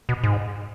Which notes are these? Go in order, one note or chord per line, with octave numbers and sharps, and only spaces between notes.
B2
G#2